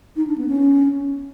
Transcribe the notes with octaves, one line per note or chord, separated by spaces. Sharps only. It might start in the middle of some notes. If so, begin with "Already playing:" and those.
D#4
D4
B3
C#4